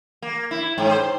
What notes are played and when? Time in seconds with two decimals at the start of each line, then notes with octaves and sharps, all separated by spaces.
0.22 A#3
0.51 E4
0.78 G#2
0.91 C5